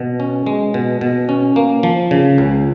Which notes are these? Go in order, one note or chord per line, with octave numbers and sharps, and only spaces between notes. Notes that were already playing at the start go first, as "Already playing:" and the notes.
Already playing: B2
C#4
G#3
B2
B2
C#4
A#3
F3
C#3
C#2